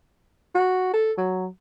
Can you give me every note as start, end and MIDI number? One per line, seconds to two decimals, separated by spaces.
0.55 0.91 66
0.93 1.12 69
1.18 1.47 54